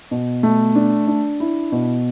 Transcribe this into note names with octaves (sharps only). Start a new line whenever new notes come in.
B2
A3
D4
D4
E4
B2